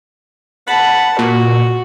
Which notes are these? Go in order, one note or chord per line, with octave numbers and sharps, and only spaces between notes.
F#5 A5 B5
A#2 F#4